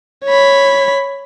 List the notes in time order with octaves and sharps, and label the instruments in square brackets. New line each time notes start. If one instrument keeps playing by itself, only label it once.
[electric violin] C#5 B5